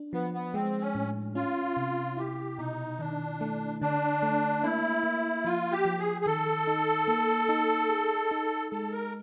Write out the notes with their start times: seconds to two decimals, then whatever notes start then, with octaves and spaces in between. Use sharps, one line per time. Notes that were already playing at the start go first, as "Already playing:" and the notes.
Already playing: D4
0.13 F3 B3
0.34 B3
0.54 G#3 C4
0.81 C#4
0.95 A2
1.35 C#4 F4
1.77 C3
2.17 E4 G4
2.58 B2 D#4
2.99 D#3 D4
3.41 A3
3.81 D3 D4
4.23 A3
4.63 A#3 E4
5.04 A#3
5.45 F3 F4
5.72 G4
5.85 F3
5.99 G#4
6.21 G#4
6.26 D#3 A4
6.67 D#4
7.08 A#3
7.49 D#4
7.90 G#4
8.31 D#4
8.72 G#3 A4
8.92 A#4